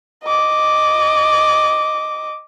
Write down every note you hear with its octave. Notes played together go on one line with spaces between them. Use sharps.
D#5 D6